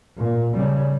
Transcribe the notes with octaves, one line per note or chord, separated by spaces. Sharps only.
A#2
C#3 G3